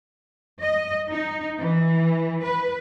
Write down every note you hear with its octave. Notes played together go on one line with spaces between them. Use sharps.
D#5
D#4
E3
B4